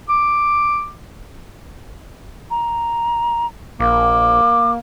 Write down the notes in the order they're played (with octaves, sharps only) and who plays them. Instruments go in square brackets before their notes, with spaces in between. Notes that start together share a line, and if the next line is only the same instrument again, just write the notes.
[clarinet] D6
[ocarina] A#5
[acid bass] A#1 [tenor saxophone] A#3 [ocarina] D6